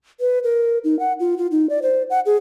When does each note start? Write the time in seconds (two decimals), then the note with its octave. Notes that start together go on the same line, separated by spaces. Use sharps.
0.20 B4
0.44 A#4
0.84 D#4
0.99 F#5
1.20 F4
1.37 F4
1.51 D#4
1.70 D5
1.82 C5
2.10 F#5
2.26 G#4